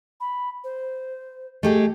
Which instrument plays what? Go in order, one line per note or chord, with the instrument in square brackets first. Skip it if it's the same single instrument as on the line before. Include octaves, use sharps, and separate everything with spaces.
[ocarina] B5
C5
[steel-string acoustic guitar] A3 G4 G#4 [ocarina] D#5